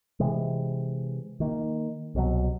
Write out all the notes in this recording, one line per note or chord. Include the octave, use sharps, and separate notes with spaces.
C3 E3 G#3
D#3 A#3
C2 B2 E3 F#3